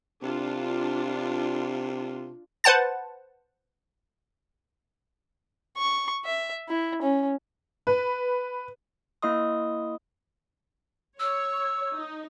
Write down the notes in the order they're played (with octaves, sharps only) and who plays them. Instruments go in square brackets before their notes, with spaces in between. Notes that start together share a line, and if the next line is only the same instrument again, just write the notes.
[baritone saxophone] C3 [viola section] D4 F4
[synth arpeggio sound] B4 C5 F#5 A5 A6
[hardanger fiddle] C#6
E5
E4
C#4
[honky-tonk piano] B4
[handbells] A#3 E4 D#5 C6 D#6
[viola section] C#5 [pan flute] E6
[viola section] D#4